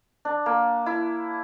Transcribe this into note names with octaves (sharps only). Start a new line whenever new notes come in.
D4
A#3
E4